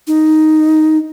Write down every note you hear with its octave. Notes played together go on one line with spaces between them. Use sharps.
D#4